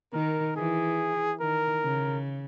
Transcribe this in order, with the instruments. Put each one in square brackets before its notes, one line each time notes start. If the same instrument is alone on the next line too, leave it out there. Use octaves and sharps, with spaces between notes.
[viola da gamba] D#3 [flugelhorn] A#4
[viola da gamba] E3 [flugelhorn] G#4
[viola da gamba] D#3 [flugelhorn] A#4
[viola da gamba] C#3